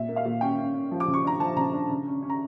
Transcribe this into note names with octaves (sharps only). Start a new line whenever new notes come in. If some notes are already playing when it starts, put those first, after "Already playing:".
Already playing: A#2 E5
A#3
F5
A#2
C#4 G5
C#4
C#4
F3
D6
C#3
C#6
D4 A#5
F3 A5
C#3 A#5
D4
C#3
C#4
C#4
A#5